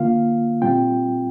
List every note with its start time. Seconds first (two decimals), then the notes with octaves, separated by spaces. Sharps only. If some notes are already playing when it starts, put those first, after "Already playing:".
Already playing: D3 A#3 F4 F5
0.62 A#2 G3 C4 F4 G5